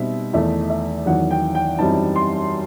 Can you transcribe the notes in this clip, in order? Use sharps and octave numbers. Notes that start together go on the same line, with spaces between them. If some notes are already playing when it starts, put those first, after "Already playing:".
Already playing: B2 G3 C4 D#4 E5
E2 D#3 A3 D#4 E5
E5
E2 D#3 F#3 F#5
G5
G5
F#2 E3 G3 C4 D#4 A5
C6